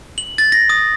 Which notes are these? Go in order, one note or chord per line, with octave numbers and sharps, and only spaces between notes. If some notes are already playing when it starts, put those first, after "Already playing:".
F#7
A6
A#6
D#6